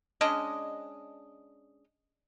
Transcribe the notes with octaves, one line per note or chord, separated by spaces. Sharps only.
G#3 C#4 D4 D#5